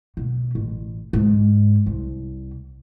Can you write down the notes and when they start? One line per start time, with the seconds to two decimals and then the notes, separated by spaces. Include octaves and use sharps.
0.17 B2
0.55 A1
1.13 G#2
1.86 C2